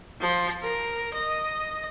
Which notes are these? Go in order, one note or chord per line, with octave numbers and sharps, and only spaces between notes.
F3
A#4
D#5